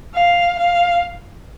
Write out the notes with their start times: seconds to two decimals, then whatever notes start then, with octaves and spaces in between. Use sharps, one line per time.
0.15 F5
0.59 F5